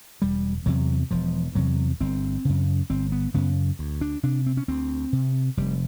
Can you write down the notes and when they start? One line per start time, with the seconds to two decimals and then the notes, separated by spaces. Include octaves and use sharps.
0.22 E1 G3
0.66 E2 C3 F#3
1.11 E1 F3
1.55 E2 C3 F#3
2.01 G1 C4
2.45 F#2 C#3
2.90 G1 C4
3.12 B3
3.34 F#2 C#3 B3
3.79 D2
4.01 D4
4.23 C3 D4
4.46 C4
4.57 C#4
4.68 D2 C4
5.13 C3
5.57 F1 G3